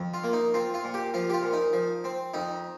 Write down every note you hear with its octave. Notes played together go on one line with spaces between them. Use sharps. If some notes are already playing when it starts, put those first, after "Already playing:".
Already playing: F2
F4
A#3
D#4
C4 F4
F4
A#2
G4
F3 F4
G4
F4
A#2
D#4
F3
C4
F2 D#4